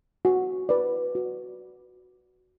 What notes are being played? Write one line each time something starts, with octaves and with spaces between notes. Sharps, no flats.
F#4
B4 D5
F#4